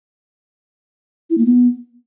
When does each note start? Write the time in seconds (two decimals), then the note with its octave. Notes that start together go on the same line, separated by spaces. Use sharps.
1.30 E4
1.38 A#3
1.45 B3